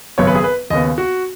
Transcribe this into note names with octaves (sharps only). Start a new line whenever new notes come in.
G#1 F#2 C#3 B3 C#5
B4
G#4
B4
D#2 C#3 B3 D#5
F#4